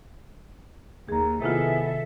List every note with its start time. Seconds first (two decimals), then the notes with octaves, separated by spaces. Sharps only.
1.09 D#2 G#4 A#5
1.42 C3 D#3 B3 E4 F4 G#4 A4 E5